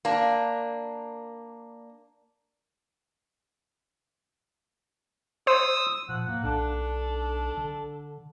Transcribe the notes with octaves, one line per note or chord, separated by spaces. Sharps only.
A#3 D4
C5 D#6 E6
A#2 F3 F#5
A2 A#3
B1 D4 A4
D3